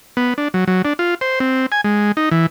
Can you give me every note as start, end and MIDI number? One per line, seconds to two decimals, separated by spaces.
0.17 0.34 59
0.38 0.48 62
0.54 0.64 54
0.67 0.82 54
0.85 0.93 62
0.99 1.15 65
1.21 1.39 72
1.40 1.66 60
1.72 1.81 80
1.84 2.12 56
2.17 2.29 63
2.31 2.46 52